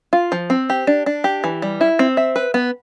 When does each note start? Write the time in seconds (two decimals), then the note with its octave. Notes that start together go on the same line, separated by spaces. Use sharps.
0.13 F4
0.32 F3
0.50 C4
0.70 G4
0.87 D4
1.06 D4
1.24 G4
1.44 E3
1.62 G3
1.81 E4
1.99 C4
2.17 E5
2.36 B4
2.54 B3